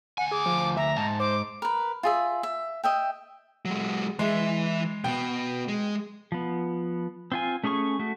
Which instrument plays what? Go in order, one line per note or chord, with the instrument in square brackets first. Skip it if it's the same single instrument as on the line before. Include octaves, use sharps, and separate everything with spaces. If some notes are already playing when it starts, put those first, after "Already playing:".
[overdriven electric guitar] D2 G#5 [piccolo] F#5
[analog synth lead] G#4 [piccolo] D6
[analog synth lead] F3
[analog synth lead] E5 [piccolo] A#5
[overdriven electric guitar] G#2 [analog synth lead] A5
[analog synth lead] C5 [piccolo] D6
[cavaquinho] A#4 B4
F4 G#4 E5
E5
D#5 E5 G5
[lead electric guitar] F#3 G#3
[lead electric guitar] E3 E5 [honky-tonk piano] G#3
[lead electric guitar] B2 B3 [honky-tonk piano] G5
[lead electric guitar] G#3
[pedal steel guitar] F3 B3
C4 F4 G#5
A3 C#4 G#4 G#5 C#6
A3 F#4